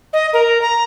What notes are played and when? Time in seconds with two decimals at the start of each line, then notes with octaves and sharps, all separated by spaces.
0.13 D#5
0.33 A#4
0.62 A#5